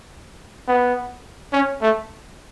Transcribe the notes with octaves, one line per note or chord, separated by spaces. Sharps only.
B3
C#4
A3